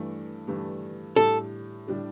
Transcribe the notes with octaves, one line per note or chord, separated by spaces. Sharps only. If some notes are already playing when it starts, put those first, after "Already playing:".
Already playing: G2 E3 A3 D4 G4
G2 E3 A3 D4 G4
A2 G3 D4 G4 A4
A2 G3 D4 G4